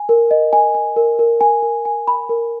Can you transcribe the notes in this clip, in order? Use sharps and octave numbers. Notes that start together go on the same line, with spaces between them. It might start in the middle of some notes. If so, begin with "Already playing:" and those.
Already playing: G#5
A#4
D#5
G#5
G#5
A#4
A#4
G#5
A#4
G#5
B5
A#4